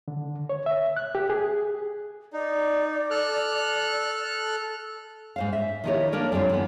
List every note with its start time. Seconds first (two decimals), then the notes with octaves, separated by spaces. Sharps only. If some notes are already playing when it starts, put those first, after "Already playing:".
0.08 D3
0.49 C#5
0.66 E5
0.97 F#6
1.15 G4
1.30 G#4
2.33 D#4 D5
3.10 A4 F6 F#6
5.36 G#2 C5 F5
5.53 E5
5.84 D#3 F3 D#4 E4 G4 C#5
6.12 A#3 D4 A#4 C#5 D5
6.32 F#2 D3 G3 C4 F4
6.49 E3 B3